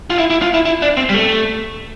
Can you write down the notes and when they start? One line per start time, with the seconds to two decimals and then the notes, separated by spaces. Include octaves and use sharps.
0.10 F4
0.18 E4
0.30 E4
0.42 F4
0.54 E4
0.65 E4
0.82 D4
0.97 C4
1.09 G3
1.14 A3